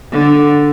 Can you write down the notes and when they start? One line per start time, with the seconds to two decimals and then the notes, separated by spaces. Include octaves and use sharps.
0.12 D3